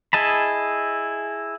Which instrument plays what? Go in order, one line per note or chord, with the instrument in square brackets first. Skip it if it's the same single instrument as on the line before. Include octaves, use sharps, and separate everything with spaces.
[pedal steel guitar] E4 G#4 D#5 A5 B5